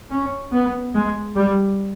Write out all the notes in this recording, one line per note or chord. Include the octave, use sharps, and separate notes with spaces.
C#4
B3
G#3
G3